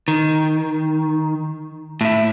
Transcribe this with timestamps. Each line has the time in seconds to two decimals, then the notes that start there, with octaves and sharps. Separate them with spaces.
0.08 D#3
2.01 A2 E4